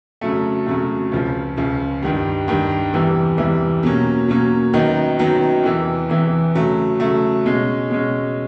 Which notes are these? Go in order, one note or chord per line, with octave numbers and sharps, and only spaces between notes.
F2 C#3 F#3 A3
F2 C#3 F#3 A3
C#2 C#3 F3
C#2 C#3 F3
G2 D#3 G3
G2 D#3 G3
E2 C3 E3 G3
E2 C3 E3 G3
B2 F#3 A#3 C#4
B2 F#3 A#3 C#4
F#2 D#3 F#3 B3 D#4
F#2 D#3 F#3 B3 D#4
E2 C3 E3
E2 C3 E3
C#3 F#3 A3
C#3 F#3 A3
B2 G#3 C#4
B2 G#3 C#4